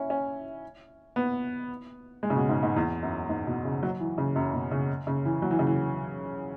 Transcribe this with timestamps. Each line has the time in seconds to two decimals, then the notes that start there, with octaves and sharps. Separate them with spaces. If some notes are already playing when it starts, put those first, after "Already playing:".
Already playing: C#4 E4
0.10 C#4
1.16 B3
2.23 G#3
2.30 C#3
2.36 B2
2.49 G#2
2.63 G#2
2.76 E2
3.03 F#2
3.29 G#2
3.47 B2
3.65 C#3
3.83 F#3
4.00 E3
4.18 C#3
4.36 F#2
4.54 B2
4.71 C#3
5.07 C#3
5.25 E3
5.42 F#3
5.51 E3
5.59 C#3
5.67 E3